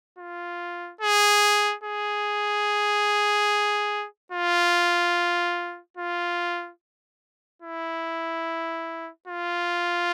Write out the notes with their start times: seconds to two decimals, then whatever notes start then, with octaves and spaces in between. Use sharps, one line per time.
0.18 F4
1.01 G#4
1.84 G#4
4.32 F4
5.97 F4
7.62 E4
9.27 F4